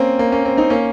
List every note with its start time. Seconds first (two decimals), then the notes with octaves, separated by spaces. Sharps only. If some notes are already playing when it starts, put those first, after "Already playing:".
Already playing: A#3 C4 C#4
0.19 A#3
0.32 A#3 C#4
0.45 C4
0.57 C4 D#4
0.70 A#3 C#4